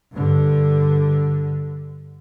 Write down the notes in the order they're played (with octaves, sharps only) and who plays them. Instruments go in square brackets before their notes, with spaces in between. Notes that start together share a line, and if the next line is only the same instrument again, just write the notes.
[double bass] G2 D3